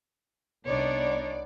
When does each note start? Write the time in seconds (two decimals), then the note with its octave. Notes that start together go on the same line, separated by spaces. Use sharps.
0.65 C2 B3 D4 D#4 C#5 D5